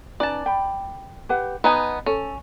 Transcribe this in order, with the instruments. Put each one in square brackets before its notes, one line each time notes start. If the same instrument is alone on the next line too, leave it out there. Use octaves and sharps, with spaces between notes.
[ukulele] C#4 D#4 B4 [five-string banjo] D5 A5
[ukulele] G5 B5
G4 B4 F#5
[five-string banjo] B3 D#4 G#5 [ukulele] B4
[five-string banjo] C#4 [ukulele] A4